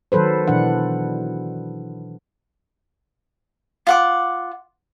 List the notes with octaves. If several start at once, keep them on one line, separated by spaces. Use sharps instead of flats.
D#3 F#3 A4 B4 C5
B2 E3 D4 F#5
F4 F#5 D6